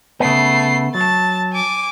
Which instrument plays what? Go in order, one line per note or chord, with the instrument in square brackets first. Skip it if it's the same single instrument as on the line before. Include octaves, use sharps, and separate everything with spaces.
[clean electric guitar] C#3 B3 [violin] A3 C7
[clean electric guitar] F#3 [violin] A5 A6
[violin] G#5 D6